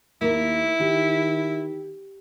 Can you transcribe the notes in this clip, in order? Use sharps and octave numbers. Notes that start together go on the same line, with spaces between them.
D#2 A#3 E4 A#4
D#3 G4